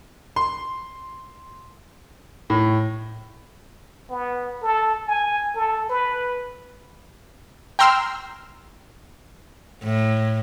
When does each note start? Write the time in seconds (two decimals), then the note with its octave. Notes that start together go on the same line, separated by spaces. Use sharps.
0.36 C6
2.50 A2
4.10 B3
4.62 A4
5.08 G#5
5.55 A4
5.90 B4
7.79 G5 A#5 C6 E6 F6
9.83 A2